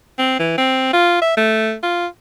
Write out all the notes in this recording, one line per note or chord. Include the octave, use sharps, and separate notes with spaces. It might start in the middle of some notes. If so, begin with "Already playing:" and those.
C4
E3
C4
F4
E5
A3
F4